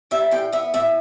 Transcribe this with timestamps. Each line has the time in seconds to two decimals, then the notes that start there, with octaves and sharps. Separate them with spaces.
0.11 G3 E5
0.31 A2 G5
0.52 B3 E5
0.74 A2 E5